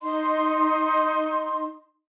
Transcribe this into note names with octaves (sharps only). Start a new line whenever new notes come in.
D#4 D#5 C6